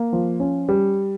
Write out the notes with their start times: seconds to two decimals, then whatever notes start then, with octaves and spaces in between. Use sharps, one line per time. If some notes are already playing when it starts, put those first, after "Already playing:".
Already playing: A#3
0.13 F3
0.40 C#4
0.69 G3